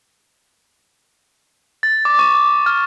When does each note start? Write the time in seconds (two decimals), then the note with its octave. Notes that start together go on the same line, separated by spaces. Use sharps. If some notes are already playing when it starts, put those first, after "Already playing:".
1.83 A6
2.05 D6
2.19 C#6
2.35 D6
2.66 F6